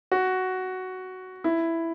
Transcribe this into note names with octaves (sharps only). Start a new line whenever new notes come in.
F#4
E4